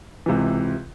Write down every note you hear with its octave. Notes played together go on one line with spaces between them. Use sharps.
C#2 C3 E3